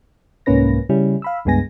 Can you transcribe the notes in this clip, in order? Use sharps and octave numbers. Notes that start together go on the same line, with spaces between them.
C2 G#2 A#3 C#4 B4 A#6
C#3 G3 C#4 E4
F5 B5 E6
C#2 G2 G#3 B3 G#5 A#6